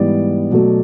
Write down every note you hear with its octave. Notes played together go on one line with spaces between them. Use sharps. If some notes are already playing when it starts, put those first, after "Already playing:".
Already playing: G#2 E3 G3 B3 D5
B2 F#3 A3